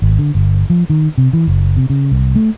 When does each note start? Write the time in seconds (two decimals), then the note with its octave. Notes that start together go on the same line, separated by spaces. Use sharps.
0.02 G#1
0.19 D3
0.35 G1
0.70 F3
0.90 D#3
1.18 C3
1.33 E3
1.47 F#1
1.77 C3
1.90 C#3
2.11 C2
2.36 A3